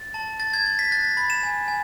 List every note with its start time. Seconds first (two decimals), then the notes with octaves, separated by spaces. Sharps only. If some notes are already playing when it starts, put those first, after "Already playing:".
Already playing: A6
0.14 A5
0.40 A5 A6
0.54 G#6
0.65 A5 A6
0.79 B6
0.91 F#6 A6
1.05 B6
1.17 B5 A6
1.30 E7
1.43 G#5
1.68 G#5